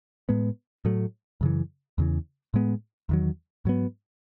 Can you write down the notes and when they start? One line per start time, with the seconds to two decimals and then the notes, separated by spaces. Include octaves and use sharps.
0.29 A2 G#3 B3
0.85 A2 F#3 A3
1.41 F#2 C#3 E3
1.98 E2 C#3 E3
2.54 A2 G#3 B3
3.09 E2 D#3 F#3
3.65 G#2 F#3 B3